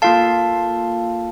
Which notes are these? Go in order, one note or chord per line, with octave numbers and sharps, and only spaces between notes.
A#3 F4 A4 F5 A5